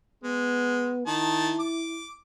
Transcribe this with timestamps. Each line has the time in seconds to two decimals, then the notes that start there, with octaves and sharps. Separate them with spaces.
0.24 G#3 B3
1.07 D#3 E4 A5
1.60 D6